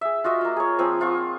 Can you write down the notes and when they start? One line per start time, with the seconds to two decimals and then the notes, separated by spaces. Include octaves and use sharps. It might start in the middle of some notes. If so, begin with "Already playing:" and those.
0.01 G#4 E5
0.24 F4 F#4 D#5 E5
0.41 A#3 F4
0.56 G#4 C#5
0.78 F3 C4 G#5
1.00 C4 F4 F#5 C#6